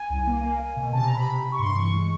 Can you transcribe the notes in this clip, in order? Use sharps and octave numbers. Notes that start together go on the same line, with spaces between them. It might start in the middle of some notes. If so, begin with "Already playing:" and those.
Already playing: G#5
C2
A#3
A#3
A#3
B2
C3 A5
A#5
C3
B5
C3
C3
C#6
G2 C6
E3 C#6
G#3